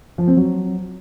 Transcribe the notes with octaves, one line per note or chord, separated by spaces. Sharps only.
F3
C4
F#3